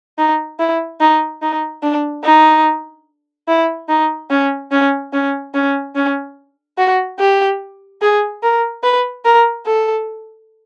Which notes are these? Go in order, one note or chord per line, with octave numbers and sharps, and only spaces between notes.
D#4
E4
D#4
D#4
D4
D#4
E4
D#4
C#4
C#4
C#4
C#4
C#4
F#4
G4
G#4
A#4
B4
A#4
A4